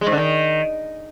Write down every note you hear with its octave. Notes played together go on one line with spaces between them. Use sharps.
G#3
G#2
D3
D#3